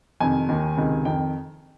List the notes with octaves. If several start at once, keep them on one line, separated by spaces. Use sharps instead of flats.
F2 C3 D#3 G#5
D#2 D#3
C#2 C3 D#3
F2 D#3 G5